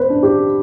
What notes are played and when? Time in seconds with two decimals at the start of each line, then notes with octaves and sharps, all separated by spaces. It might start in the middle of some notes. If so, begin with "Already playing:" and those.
Already playing: B3 B4 C5
0.10 D4
0.23 G4